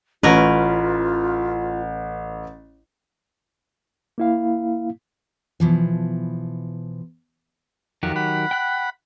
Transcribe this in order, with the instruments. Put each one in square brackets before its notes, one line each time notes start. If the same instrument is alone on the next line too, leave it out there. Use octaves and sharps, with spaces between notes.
[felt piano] A1 [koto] C#4 A#4 B4 [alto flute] F4
[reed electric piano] A#3 E4 F5
[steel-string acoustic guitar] B2 E3 F3
[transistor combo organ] F2 F#4 [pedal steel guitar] D#3 F#3 G4
[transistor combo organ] F#5 B5
[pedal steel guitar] G5 F#6